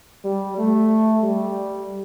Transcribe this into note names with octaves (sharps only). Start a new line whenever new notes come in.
G3
A3
G3